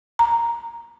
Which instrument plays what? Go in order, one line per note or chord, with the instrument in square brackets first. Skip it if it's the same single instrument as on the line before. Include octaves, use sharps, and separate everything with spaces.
[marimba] A#5